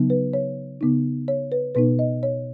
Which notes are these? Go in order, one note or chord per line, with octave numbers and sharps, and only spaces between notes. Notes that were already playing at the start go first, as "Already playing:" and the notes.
Already playing: C#3 F#3 B3 D#4
B4
C#5
C#3 B3 D#4
C#5
B4
B2 B3 D#4 B4
D#5
C#5